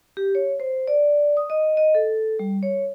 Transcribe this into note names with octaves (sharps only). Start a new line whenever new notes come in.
G4
C#5
C5
D5
D#6
D#5
D#5
A4
G3
C#5